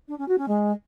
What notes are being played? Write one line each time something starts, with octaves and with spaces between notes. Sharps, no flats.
D4
C#4
F#4
C#4
G#3